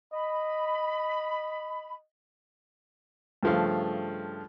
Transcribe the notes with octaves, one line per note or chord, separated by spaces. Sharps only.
D#5 B5
G2 C#3 F3 A3 F5